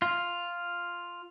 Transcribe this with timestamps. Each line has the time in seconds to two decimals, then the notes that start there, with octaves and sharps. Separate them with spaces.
0.02 F4